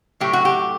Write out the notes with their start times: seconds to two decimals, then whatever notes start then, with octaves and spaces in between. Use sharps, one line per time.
0.20 A2 F#3 A3 G4
0.33 F#4
0.45 G4